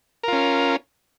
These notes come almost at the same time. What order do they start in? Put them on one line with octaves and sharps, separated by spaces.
A#4 F4 C#4